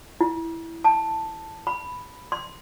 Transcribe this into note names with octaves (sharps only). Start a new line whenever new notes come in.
E4
A5
B5
C6